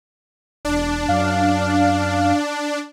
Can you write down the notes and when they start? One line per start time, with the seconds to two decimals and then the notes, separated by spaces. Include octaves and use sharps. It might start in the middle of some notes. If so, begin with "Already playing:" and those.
0.65 E1 D4
1.08 F#2 F5